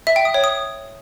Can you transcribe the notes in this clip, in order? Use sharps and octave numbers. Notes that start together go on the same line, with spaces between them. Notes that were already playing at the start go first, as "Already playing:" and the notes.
E5
G5
D#6
C#5
D#6